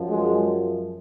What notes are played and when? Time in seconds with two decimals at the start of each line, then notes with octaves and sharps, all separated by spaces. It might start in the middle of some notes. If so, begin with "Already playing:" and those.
Already playing: F#2 F3
0.09 G#3